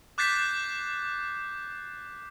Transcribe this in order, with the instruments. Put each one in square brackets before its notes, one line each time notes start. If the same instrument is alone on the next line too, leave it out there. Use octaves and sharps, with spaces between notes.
[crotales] D6 F#6 G6 A6 B6 C7